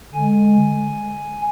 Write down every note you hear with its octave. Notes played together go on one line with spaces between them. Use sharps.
D3 G#5
G#3